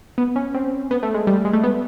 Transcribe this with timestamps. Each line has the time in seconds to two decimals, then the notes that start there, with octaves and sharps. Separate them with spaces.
0.18 B3
0.36 C#4
0.54 C4
0.91 B3
1.03 A3
1.14 G#3
1.27 G3
1.45 G#3
1.53 A3
1.63 B3